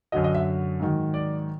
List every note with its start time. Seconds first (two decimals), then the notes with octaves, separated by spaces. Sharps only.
0.12 F#2 D3 F#3 D#5
0.24 D#5
0.35 E5
0.80 G#2 D#3 F#3
1.14 D5